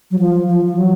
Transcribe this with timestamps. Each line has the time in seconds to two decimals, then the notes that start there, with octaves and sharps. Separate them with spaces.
0.11 F#3
0.19 F3
0.47 F3
0.65 F3
0.77 F#3